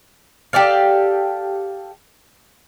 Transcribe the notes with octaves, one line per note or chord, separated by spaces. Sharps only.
G4 A4 D5 F5